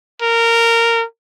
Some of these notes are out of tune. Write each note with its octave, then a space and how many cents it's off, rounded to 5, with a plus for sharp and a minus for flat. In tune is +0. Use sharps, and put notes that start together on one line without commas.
A#4 -15